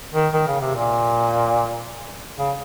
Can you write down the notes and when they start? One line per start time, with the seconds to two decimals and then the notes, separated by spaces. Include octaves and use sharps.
0.14 D#3
0.33 D#3
0.47 C#3
0.61 C3
0.75 A#2
2.38 C#3